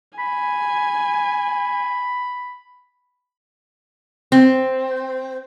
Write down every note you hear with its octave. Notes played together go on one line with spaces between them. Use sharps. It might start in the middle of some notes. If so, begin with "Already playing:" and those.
G#5 B5
C4